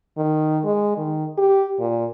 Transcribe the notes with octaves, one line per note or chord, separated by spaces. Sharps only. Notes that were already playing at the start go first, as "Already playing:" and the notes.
D#3
G#3
D#3
G4
A#2